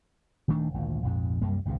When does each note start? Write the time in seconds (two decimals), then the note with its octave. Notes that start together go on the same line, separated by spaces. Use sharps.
0.48 D#1 D#3 A3 D4
0.74 G#1 D2 A#2
1.03 A#1 F2 G#2
1.41 C2 F#2 G3 A#3
1.65 G#1 C#2 G#2 B2